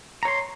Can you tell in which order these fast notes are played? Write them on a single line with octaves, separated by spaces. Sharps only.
A#5 C#5 C6